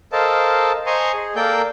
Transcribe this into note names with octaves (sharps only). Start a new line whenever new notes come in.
A4 A#4 C5 D#5 F5 A5
C5 D#5 G#5 A#5 C6 C#6
G#4
A#3 A4 A#4 D5 G5 G6